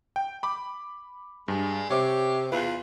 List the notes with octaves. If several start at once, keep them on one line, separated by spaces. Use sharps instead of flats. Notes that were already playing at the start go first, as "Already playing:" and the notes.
G5
B5 D6
G2 G#3
C3 G4 C#5 D6
E2 F4 B4